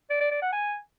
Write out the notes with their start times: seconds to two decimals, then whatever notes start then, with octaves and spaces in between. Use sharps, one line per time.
0.10 D5
0.21 D5
0.31 D5
0.42 F#5
0.53 G#5